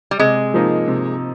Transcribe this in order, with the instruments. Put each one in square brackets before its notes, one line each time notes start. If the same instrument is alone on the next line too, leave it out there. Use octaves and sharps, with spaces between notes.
[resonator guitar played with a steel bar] G3
[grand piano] C3 [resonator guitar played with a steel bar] G#3
[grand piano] F3 A#3 D#4
C3